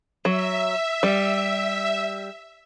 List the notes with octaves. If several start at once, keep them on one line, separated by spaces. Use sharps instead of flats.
F#3 E5
G3